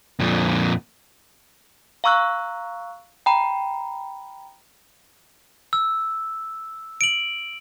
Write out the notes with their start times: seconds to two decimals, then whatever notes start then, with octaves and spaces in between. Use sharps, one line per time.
0.19 F2 A#2
2.04 F5 A#5 C#6 E6 F#6
3.26 G5 A#5 B5
5.73 E6
7.01 D7 F#7